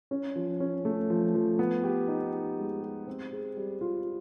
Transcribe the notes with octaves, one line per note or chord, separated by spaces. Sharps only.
C#4
F3
C#4
A3
F3
F3
B3
G4
D#4
G4
G#3
G4
C4
G#4
G3
F4